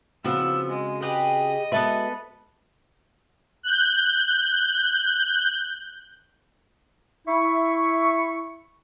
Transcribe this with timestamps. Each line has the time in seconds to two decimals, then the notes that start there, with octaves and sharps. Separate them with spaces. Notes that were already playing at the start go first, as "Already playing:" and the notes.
0.24 C#3 F3 B3 C4 F#4 E6
0.69 G#3
1.02 G4 G#4 B4 D#5
1.72 G#3 B3 F#4 A4 B4 E5
3.63 F#6 G6
7.27 E4 E5 C#6